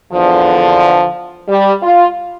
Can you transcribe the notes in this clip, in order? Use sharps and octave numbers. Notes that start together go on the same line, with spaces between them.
E2 D3 F3
G3
F4